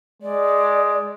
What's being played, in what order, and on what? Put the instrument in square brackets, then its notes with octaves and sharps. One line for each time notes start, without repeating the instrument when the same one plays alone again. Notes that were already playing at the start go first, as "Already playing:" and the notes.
[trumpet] G#3 [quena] D5